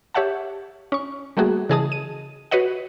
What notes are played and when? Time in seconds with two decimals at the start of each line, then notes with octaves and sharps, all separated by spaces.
0.14 G4 C#5 E5 F#5 A5
0.92 C#4 C#6
1.37 G3 A3 A#3 F#4 G#4
1.69 C#3 E3 G#4 D#5 A5 D#6
1.92 D#7
2.51 F#4 B4 C#5 D#5 F#5